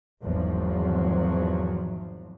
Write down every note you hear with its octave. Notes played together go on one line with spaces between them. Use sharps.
G#1 E2 G#2 F3 F#3